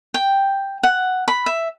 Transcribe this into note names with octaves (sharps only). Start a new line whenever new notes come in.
G5
F#5
B5
E5